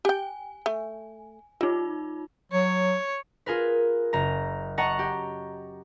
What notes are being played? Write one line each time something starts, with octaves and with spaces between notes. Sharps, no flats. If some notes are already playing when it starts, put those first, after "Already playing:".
G4 G5 G#5
A3
G3 D#4 F4
F#3 C#5
F4 G#4 A#4 B4
F#1 A#5
D#5 F#5 A5 A#5 C#6
G4